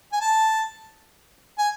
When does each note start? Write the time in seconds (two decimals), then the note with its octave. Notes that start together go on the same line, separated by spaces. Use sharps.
0.13 G#5
0.21 A5
1.58 G#5